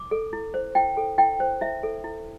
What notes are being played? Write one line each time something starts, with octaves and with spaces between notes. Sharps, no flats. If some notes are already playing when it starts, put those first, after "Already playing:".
Already playing: D6
A4
E4
C5
E4 G5
A4
E4 G5
C5
E4 E5
A4
E4